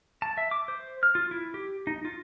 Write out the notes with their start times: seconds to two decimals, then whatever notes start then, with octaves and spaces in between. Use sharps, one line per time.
0.22 A5
0.37 E5
0.51 D6
0.68 C5
1.03 F6
1.15 F4
1.31 E4
1.54 G4
1.87 D#4
2.05 F4